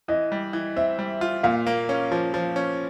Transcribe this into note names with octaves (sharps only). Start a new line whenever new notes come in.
E3 D#5
G3
E3
C4 E5
G3
F4
A#2 F5
A#3
C#4
F3
F3
C#4